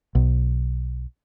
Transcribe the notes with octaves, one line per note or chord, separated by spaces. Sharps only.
B1